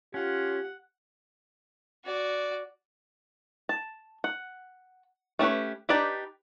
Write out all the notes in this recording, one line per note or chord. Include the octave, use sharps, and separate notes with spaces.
C#4 F4 G4 F#5
F#4 D5
A5
F#5
A3 C#4 G4 B4
D4 D#4 G4 B4 D5